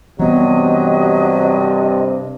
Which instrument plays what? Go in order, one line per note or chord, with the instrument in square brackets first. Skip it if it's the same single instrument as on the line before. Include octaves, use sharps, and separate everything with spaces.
[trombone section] G2 C3 [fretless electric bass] E3 B3 [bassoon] F#3 [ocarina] D#5